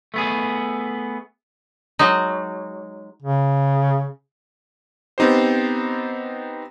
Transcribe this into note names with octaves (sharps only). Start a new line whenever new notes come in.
A3 B3 G#4
F#3 G#3 D#4
C#3
B3 C4 D#4 G4 C5